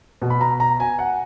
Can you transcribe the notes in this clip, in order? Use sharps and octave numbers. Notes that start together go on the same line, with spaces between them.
B2
B5
A#5
A#5
G#5
F#5